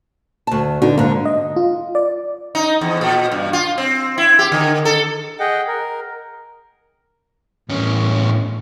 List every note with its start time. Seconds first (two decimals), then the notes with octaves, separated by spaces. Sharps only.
0.47 D2 A5
0.82 D3 B3 D#4 F#4
0.98 G#2 D3 A#3
1.25 D#5
1.56 F4
1.95 D5
2.55 D#4
2.81 E2
3.01 A#2
3.32 G2
3.53 F4
3.78 C4
4.18 E4
4.39 G4
4.52 D3
4.85 A4
5.40 G#4 D#5 F#5 G5
5.68 A#4
7.69 E2 A2 C#4